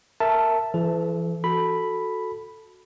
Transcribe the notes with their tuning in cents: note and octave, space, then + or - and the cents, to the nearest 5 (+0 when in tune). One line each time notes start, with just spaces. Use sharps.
A#4 -15 E5 +0 A5 +0
E3 +40 A4 -30
F#4 -10 A4 +0 B5 +0